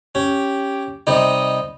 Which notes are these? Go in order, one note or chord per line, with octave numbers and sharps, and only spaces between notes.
C#4 G4
C3 G3 D#4 D#5